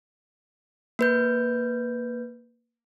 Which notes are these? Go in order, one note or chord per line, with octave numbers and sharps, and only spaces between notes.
A#3 B4 G6